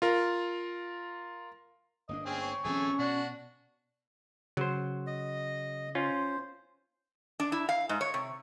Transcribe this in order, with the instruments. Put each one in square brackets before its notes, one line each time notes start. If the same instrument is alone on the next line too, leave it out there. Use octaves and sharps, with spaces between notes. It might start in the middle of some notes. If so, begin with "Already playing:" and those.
[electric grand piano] F4 A#4
[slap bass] G1 A#3 D4 [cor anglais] D#5
[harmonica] C4 G#4 [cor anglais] C#4
[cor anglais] C#5
[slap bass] D#1 F3 C4 [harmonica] A3 G#4 [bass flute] C#4
[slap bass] B2 [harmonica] D4 F#4
[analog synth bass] C#3 [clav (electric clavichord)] F#3 C5
[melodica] D#5
[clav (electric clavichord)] C#4 F4 [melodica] C5
[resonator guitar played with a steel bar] D4
E4
F5
G#2
C#5
C3